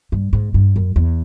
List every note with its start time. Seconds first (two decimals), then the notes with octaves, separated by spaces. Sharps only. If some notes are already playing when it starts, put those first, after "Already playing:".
0.12 G2
0.33 G#2
0.54 G2
0.76 F#2
0.96 E2